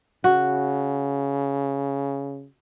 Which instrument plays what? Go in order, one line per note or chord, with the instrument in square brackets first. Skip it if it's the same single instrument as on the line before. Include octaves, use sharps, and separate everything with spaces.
[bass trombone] C#3 [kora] F#4